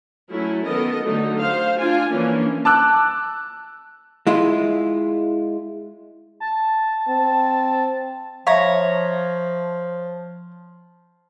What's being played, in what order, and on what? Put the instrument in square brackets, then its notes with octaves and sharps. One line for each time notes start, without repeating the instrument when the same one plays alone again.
[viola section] F#3 A3 C#4 E4
D#3 B3 A4 A#4 D#5
D3 F#3 A3 D#4
C5 F5
D4 F4 G#5
E3 F3 A#3 C#4 D4
[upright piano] A5 D6 E6 F#6
[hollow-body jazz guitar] G#3 E4 F4
[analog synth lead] A5
[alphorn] C4
[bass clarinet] F3 [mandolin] C#5 A#5 [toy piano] E5 F5